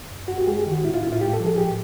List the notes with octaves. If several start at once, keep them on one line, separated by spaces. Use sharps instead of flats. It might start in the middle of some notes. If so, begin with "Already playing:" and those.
F#2
F#2 F#4
G4
G#3 G#4
G4
D#3
F#4
A2 E4
F4
A2 E4
F4
G#3 G4
A4
F3
G#4
A2 G4